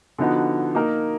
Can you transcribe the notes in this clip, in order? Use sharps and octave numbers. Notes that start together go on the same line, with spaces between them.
D3 F3 B3 D#4 F#4
A#3 D#4 A#4